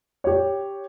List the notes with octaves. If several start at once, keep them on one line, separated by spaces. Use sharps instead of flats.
G4 C#5